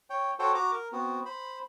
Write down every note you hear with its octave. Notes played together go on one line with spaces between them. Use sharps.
C#5 G5
F#4 A4 C5 C#5 G5
F#4 A#5 D6
A#4
B3 C4 F#4
C5 B5